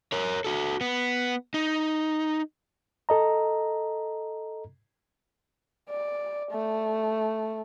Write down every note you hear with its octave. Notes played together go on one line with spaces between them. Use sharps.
A#4 C#5
F#4 A4
B3
D#4
A4 D#5 A#5
D5
A3